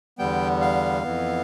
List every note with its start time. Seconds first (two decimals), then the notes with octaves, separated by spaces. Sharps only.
0.18 E2 D3 G3 B3 G5
0.61 F5
1.03 F2 E3 B3